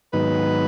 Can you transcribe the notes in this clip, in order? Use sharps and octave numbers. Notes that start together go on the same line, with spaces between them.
G#2 D#3 F#3 B3 D#4 B4